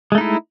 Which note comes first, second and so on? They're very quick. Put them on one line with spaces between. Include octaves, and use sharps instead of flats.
G#3 A3 D#4 E4